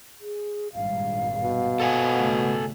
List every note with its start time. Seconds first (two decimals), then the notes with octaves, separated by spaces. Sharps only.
0.21 G#4
0.74 G#1 G2 A#2 F5
1.43 B2
1.80 A4 F#5 G#5
2.14 G#1 C#3 A3